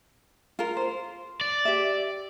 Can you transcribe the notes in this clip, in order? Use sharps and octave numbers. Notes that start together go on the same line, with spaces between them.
F4 A#4
C5
D5
G4 E5